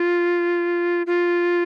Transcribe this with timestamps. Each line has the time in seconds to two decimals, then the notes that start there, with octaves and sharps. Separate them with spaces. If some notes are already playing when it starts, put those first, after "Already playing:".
Already playing: F4
1.07 F4